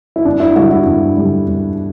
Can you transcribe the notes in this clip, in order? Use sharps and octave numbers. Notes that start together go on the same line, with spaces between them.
E4
G2 D4
E4
D3 G3 F#4
E4
G2
D3 G3
G2